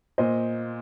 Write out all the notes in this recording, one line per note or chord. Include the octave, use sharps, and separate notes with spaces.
A#2 C5 D#5